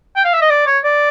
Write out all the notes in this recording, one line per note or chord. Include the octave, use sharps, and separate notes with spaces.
G5
F5
E5
D#5
D5
C#5
D5